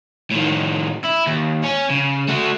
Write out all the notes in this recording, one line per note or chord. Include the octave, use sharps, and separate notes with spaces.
A2 D#3
E4
D#2
C#4
C#3
A3 F#4